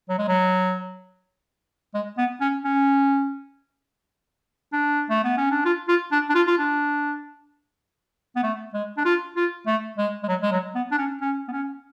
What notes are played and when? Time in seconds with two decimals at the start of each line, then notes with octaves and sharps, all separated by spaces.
0.09 F#3
0.18 G#3
0.28 F#3
1.94 G#3
2.18 B3
2.41 C#4
2.65 C#4
4.73 D4
5.10 A3
5.24 B3
5.37 C#4
5.51 D4
5.65 F4
5.88 F4
6.12 D4
6.29 D4
6.35 F4
6.47 F4
6.58 D4
8.36 B3
8.43 A3
8.74 G#3
8.97 D4
9.05 F4
9.36 F4
9.67 A3
9.98 G#3
10.23 G#3
10.28 F#3
10.42 G#3
10.52 F#3
10.75 B3
10.91 D4
10.98 C#4
11.21 C#4
11.48 B3
11.52 C#4